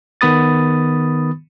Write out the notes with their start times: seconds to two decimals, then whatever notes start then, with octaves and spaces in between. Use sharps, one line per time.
0.21 D#3 B3 B5 D#6 A6